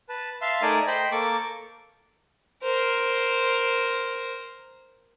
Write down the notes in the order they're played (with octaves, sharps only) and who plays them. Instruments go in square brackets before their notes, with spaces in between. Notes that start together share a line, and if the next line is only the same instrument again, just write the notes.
[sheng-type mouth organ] B4 A5
E5 F5 A5 C6
A3 D#4 A#4 D5 G#5 A5
C5 D#5 G5 B5
A#3 A4 C#6 D6
[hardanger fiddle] A#4 C5